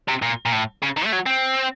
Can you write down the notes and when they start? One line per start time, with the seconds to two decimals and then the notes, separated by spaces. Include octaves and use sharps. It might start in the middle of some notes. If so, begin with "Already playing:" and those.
0.08 C3
0.22 A#2
0.46 A#2
0.52 A2
0.83 C#3
0.97 D#3
1.06 A3
1.13 F#3
1.26 C4